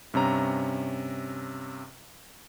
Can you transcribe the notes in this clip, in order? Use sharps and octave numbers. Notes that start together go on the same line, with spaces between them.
G2 C3 C#4 A#5